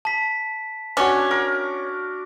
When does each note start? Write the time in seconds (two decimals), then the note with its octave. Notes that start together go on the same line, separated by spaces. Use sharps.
0.05 A5 B6
0.97 C#4 D4 F#4
1.31 A#4